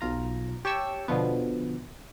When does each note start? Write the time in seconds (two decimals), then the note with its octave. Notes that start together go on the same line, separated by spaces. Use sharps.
0.01 B1 F4 A#5
0.65 G4 C#5 G5 A5 C#6 E6
1.08 B2 D3 F3 B3